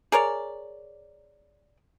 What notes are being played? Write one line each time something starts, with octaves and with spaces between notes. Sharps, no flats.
G#4 A#4 C#5 D5